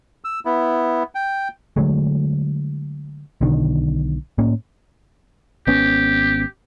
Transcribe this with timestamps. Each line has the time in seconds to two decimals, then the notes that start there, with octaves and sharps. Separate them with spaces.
0.24 E6
0.45 B3 E4
1.15 G5
1.76 D3 F#3 G#3 A3
3.41 B1 B2 D3 D#3
4.38 A2 A#3 C#4
5.67 G#1 B3 C#4 G4